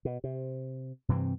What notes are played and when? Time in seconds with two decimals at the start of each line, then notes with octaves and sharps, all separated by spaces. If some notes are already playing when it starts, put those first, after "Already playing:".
0.05 B2
0.24 C3
1.09 G2 C3 E3 C4